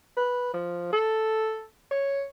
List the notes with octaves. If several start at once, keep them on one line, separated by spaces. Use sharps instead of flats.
B4
F3
A4
C#5